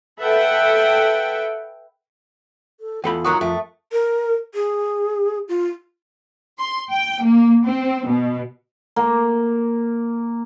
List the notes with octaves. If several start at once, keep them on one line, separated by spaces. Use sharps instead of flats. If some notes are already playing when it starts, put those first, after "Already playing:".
A4 B4 E5 F#5 G5
A4
E2 F4 A4 F#5 B5
G#2 F#3 F#4 A#4 C#6 D#6
F2 A3
A#4
G#4
F4
C6
G5
A#3
C4
B2
A#3